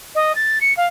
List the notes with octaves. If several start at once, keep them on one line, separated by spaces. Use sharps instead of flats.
D#5
A6
C#7
F5